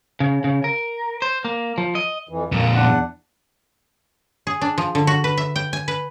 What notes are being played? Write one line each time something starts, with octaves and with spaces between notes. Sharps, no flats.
C#3
C#3
A#4
C5
A#3
F3
D#5
F2 E3
F2 A#2 A#3
E2 D4 F#5
G#4
D4
F3
D3
F#4
B4
E5
G5
G#5
B4